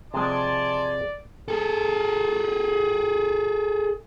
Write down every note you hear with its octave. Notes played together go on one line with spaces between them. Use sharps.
C3 F3 G#3 D5 G#5 A5 C6
G#4 A4